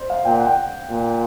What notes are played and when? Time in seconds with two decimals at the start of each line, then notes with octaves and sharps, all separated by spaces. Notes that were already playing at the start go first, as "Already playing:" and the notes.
Already playing: C5
0.10 F5
0.25 A#2 G5
0.36 F#5
0.46 G5
0.89 A#2